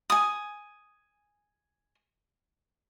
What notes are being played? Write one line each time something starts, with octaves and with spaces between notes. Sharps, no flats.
G#5 D#6